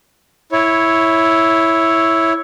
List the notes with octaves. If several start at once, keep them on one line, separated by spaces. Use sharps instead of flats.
E4 C#5